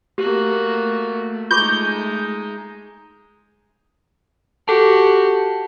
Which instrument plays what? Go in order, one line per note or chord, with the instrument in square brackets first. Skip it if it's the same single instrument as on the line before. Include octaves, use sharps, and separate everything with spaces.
[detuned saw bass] A3 [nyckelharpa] A#3 F#4 [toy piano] G4
[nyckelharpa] G#3 D#4 [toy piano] F4 C#6 D6 [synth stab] G6
[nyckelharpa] F#4 G4 [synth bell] A4 A5